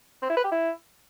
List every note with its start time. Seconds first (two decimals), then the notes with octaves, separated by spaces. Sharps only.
0.22 C4
0.30 E4
0.37 B4
0.44 G4
0.51 E4